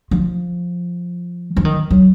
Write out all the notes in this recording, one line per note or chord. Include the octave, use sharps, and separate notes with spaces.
F3
F3
D#3
F#3